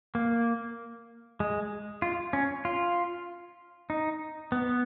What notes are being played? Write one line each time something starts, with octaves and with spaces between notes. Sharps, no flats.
A#3
G#3
F4
C#4
F4
D#4
B3